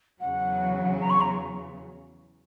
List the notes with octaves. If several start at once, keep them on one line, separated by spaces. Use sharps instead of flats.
E2 C#3 F#3 F#5
A#5
C#6
A#5